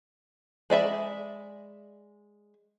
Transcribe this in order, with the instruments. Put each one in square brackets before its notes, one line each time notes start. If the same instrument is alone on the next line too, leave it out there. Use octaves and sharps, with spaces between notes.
[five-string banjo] G#3 D5 E5 B5